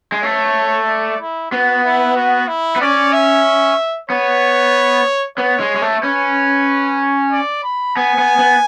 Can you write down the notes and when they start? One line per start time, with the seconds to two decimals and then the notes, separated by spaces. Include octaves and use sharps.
0.12 G#3
0.23 A3 C#5
0.87 D5
1.20 E4
1.51 B3 F#4
1.84 E4
2.16 F#4
2.48 E4
2.76 B3
2.80 C#4 D5
3.13 E5
4.10 B3 C#5
5.38 B3 C#5
5.60 G#3
5.76 G#3
5.81 A3
6.03 C#4 B4
7.32 D5
7.64 B5
7.96 B3 G#5
8.18 B3
8.39 B3